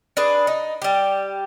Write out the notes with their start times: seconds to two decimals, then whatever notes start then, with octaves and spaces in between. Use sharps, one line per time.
0.17 D4 G#4 B4
0.47 D#4
0.82 G3 G4